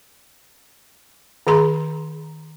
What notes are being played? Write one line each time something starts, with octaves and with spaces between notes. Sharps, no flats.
D#3 G#4 A#5 C6